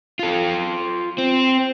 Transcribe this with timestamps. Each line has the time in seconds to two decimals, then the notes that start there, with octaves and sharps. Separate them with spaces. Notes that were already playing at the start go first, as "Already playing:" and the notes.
0.19 F4 A4
1.18 C4